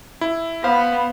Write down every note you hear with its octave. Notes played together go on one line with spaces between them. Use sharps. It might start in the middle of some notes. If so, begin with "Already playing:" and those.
E4
B3 C5 F5 B5